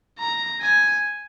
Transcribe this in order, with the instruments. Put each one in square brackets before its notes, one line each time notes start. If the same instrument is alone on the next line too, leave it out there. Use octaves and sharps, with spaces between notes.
[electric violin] A#5
G#5